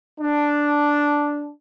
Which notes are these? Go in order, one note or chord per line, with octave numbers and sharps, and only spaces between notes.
D4